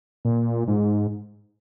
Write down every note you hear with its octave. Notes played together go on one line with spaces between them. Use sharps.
A#2
G#2